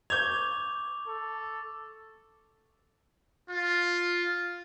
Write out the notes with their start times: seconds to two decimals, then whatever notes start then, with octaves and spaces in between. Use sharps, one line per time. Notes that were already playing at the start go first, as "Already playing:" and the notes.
0.10 C#6 D6 G6 G#6 F7
1.08 A4
3.49 F4